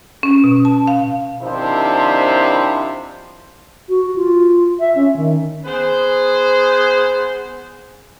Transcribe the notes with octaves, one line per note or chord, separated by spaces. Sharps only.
C#4
B2
A5
F5
C3 D#3 F3 D4 E4 C5
F#4
F4
E5
C#4
D#3
B3 G#4 C5